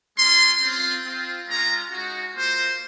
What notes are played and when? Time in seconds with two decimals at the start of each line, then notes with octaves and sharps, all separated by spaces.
0.18 G#3 C#4 F4 C6
0.62 C4 F4
1.05 C4 F4
1.47 G#3 C#4 F4 A#5
1.91 G#3 D#4 F#4
2.35 A#3 F4 C5